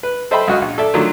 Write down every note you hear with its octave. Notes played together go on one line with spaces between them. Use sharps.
B4
A4 C5 D#5 E5 G5 B5
C#2 F#4 D#5
A#1
A4 D5 E5
D3 D#3 F3 F#3 A3 D4